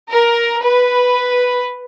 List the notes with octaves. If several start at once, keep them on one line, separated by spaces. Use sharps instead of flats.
A#4
B4